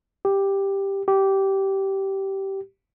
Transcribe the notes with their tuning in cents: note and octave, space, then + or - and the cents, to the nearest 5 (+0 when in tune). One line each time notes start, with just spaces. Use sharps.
G4 +5
G4 -15